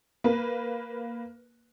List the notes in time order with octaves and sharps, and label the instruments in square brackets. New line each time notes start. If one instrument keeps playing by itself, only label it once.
[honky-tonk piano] A#3 B4